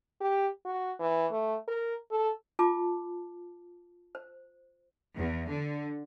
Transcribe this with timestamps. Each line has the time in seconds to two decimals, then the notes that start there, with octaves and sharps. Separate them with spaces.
0.21 G4
0.65 F#4
0.99 E3
1.31 A3
1.68 A#4
2.11 A4
2.59 F4 A5 D6
4.15 C5
5.17 E2
5.49 D3